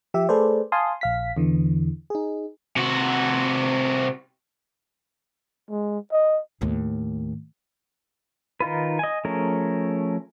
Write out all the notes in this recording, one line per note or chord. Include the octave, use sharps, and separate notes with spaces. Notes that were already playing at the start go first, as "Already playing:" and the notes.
F3 G4 E5
A3 G#4 A4 B4 C5 D5
F5 G#5 A5 C6 D#6
A#1 F5 B6
E2 D3 E3
D#4 G#4
C3 F#4
G#3
D#5
D#2 A2
D#3 D#4 F4 B4
D#5 G#5
F3 A3 C#4 G#4 A#4